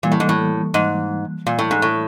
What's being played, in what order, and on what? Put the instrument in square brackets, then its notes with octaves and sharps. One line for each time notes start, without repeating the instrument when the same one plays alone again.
[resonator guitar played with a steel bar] A#2 [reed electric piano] E3 G3 A#3
[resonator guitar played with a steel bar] A2
G#2
A2
G#2
A#2
A2
G#2
A2